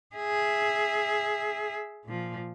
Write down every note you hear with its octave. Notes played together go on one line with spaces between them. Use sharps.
G#4 E5
A#2 F3